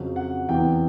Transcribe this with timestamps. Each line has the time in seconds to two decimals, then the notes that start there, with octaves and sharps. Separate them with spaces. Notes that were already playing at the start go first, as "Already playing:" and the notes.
Already playing: F2 C#3 F#3
0.16 F#5
0.49 E2 C3 E3 G5